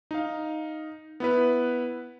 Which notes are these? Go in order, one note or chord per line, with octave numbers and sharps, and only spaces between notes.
D#4 F5
B3 E4 B4